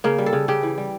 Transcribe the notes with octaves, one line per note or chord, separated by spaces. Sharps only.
C#3 A#3
G3
A4
C#3
C#3 G4
E3
G3